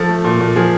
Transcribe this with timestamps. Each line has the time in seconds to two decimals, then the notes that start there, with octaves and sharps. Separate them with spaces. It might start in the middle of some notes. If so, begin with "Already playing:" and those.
Already playing: F3 A4
0.09 A3
0.25 A#2
0.41 A#2
0.56 F3 G#4